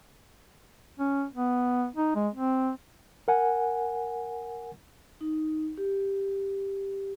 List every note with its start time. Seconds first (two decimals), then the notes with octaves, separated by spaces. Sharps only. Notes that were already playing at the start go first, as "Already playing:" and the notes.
0.99 C#4
1.34 B3
1.96 D#4
2.15 G#3
2.35 C4
3.28 A#4 F#5 G#5
5.21 D#4
5.77 G4